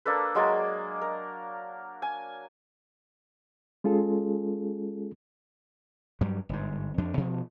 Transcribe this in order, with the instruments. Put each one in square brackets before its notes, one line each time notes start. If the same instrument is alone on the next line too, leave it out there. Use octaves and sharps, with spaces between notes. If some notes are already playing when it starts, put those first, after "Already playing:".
[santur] A#3 D4 A4 B4
F#3 G#3 A#3 D5
A#4
G#5
[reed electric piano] G#3 C#4 F4 G#4 A4
[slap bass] G2 F#3 G3
G1 G#2
F2 F3 D4
B2 F3